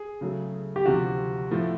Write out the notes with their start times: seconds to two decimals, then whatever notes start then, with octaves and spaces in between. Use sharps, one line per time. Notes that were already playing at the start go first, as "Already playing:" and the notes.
Already playing: G#4
0.21 C#3 F#3 A3
0.76 G4
0.86 D2 C3 F3 F#4
1.51 A2 F3 A3